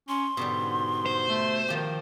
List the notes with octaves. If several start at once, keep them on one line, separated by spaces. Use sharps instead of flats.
C#4 C6
G#2 B2 D3 G3
C5
A3
D#3 F3 G4